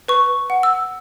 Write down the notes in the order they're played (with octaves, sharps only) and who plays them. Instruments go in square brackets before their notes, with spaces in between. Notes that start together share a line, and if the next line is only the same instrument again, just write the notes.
[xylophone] B4 C#6
F#5
E6